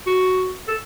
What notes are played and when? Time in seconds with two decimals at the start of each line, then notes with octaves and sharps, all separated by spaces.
0.07 F#4
0.68 A4